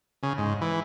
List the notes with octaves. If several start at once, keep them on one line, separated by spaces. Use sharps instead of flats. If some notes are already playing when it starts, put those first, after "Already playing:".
C#3
G#2
E3